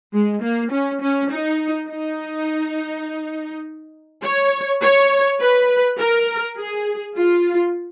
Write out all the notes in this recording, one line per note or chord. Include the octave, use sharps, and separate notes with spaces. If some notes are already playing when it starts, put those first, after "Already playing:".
G#3
A#3
C#4
C#4
D#4
D#4
C#5
C#5
B4
A#4
G#4
F4